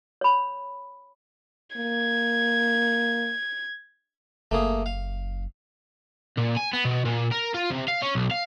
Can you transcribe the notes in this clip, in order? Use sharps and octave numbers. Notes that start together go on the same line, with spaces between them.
C#5 B5
A#3 G#6
F#1 A3 A#3 G#4
F5
A#2
G#5
B3
B2
A#2
A#4
F4
C3
F5
C#4
B1
F5